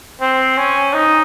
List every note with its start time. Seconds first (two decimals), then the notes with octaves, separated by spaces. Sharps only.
0.21 C4
0.58 C#4
0.94 D#4